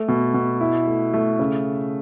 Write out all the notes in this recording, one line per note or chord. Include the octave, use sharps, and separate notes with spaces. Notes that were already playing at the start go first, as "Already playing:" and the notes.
Already playing: A3
B2
B2
E4
A3
A3
C#3